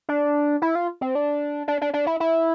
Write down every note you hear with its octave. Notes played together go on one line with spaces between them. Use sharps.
D4
E4
F4
C4
D4
D4
D4
D4
E4
E4